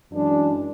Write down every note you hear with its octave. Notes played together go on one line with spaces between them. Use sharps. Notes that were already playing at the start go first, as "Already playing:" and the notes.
F#2 E3 G#3 D4